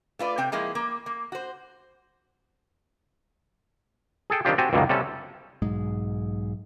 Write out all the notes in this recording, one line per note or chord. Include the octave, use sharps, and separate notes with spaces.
A3 F4 B4 D5
C3 C4 G5
F3 G#3 A#3 E4
A#3
A#3
F#4 C5
G#4 A4 G5
D#3 G3 C4 D4 F4 G4
C4 F#4 G4 G#5 A5
C#2 F#2 B2 D3 D#3 A#3
C3 G3 C#4 A4
B1 G#2 G#3